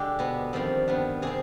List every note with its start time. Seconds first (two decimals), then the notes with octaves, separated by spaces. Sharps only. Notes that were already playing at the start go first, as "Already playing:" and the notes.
Already playing: D3 G#3 G4
0.19 B2 B3
0.53 F2 D#3 G3 C4
0.88 G2 D#3 B3
1.22 C3 G3 C4 G#4